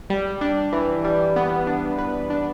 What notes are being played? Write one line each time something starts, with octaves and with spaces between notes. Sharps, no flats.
G3
D4
E3
G3
B3
D4
B4
D4